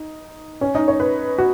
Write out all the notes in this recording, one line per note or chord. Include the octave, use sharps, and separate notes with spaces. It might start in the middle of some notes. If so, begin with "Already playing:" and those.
Already playing: D#4
C#4
D#4
C#5
B4
F#4